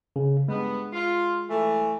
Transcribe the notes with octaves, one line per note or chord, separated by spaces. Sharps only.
C#3
G2 G#3 B3
F4
E3 A3